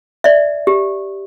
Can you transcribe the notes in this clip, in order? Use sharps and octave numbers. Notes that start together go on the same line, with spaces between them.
D5 E5
G4